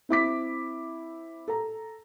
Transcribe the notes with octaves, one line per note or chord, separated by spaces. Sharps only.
C4 E4 D6 B6
A4 A#5